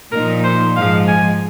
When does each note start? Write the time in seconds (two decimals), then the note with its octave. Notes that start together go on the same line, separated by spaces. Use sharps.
0.12 A#2 F3 A#3 D#4 A#4
0.44 C5
0.75 G#2 F3 G#3 F5
1.08 G#5